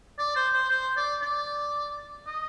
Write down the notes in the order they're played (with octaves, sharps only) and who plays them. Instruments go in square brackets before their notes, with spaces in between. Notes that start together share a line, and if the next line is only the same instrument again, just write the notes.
[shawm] D5
C5
C5
C5
D5
D5
D#5